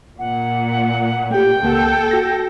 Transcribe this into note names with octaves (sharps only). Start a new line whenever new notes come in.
A#2 F#5
A3 G4 G5
C#2 A#3 A4 F#5
F#4 A#6